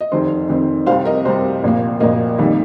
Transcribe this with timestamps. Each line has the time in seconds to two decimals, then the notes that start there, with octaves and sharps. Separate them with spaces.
0.01 D#5
0.12 F1 F2 D#3 C4 C5
0.49 F1 F2 D#3 C4
0.86 C2 C3 G3 C5 F5
1.05 A#4 D#5
1.25 C2 C3 G3 C5
1.64 A#1 A#2 A#3
2.00 A#1 A#2 A#3 A#4 D#5
2.38 F1 F2 D#3 G3 A#3